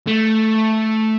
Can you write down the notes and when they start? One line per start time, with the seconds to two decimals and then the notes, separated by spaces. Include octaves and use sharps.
0.07 A3